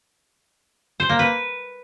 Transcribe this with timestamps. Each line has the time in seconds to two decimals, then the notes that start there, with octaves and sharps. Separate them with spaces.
1.00 C5
1.09 A#3
1.19 B4